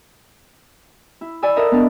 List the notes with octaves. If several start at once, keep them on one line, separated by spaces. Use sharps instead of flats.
E4
D5 G#5 B5 E6
A4 A#4 D#5 E5 F#5
B3 D4 F5